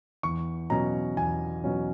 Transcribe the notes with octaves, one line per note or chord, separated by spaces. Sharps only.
E2 C#6
B2 F#3 C#4 A#5
E2 G#5
B2 F#3 C#4